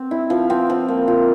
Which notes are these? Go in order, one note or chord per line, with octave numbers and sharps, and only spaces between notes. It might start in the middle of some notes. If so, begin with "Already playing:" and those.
Already playing: C4
E4
F3
C4
F3
A#3
F4